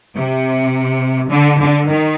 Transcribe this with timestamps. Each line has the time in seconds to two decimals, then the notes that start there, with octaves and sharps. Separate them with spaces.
0.16 C3
1.30 D3
1.58 D3
1.87 D#3